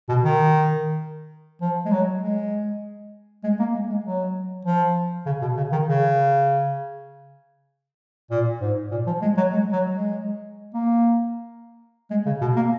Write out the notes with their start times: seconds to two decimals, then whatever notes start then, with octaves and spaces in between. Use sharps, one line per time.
0.09 B2
0.24 D#3
1.61 F3
1.85 G#3
1.92 F#3
2.22 G#3
3.44 G#3
3.59 A#3
3.74 G#3
3.89 G#3
4.05 F#3
4.65 F3
5.26 C#3
5.41 B2
5.57 C#3
5.72 D#3
5.87 C#3
8.30 A#2
8.61 G#2
8.91 A#2
9.07 F3
9.22 G#3
9.37 F#3
9.52 G#3
9.72 F#3
9.93 G#3
10.74 A#3
12.10 G#3
12.26 C#3
12.41 B2
12.56 A#3